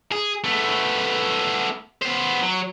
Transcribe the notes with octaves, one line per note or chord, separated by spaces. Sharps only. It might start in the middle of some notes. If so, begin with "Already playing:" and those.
G#4
A3 B3
B3 C5
F#3